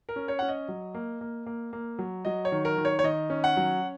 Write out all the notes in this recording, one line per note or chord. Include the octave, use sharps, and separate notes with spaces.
A#4
C#4
C#5
C#4 F#5
D#5
F#3
A#3
A#3
A#3
A#3
F#3
F#3 D#5
C#5
D#3
A#4
D#3
C#5
C#5
D#3 D#5
C#4
F#5
F#3